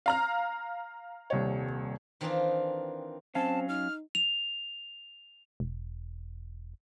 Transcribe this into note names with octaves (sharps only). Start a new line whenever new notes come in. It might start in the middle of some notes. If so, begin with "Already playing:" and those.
F5 A#5 F6
D#1 C2 C#5
D#3 E3 C4 D4 D#4 F4
F#3 C4 C#4 F5 A5
D#4 F6
F7
E1